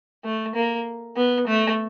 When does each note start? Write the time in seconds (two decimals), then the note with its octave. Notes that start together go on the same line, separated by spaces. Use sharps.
0.24 A3
0.55 A#3
1.17 B3
1.48 A3